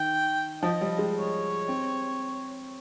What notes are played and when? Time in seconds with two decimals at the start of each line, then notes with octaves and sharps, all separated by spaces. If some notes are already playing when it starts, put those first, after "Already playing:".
Already playing: D#3 G5
0.63 F3 D#5
0.81 G3
0.98 G#3
1.16 C#5
1.68 C4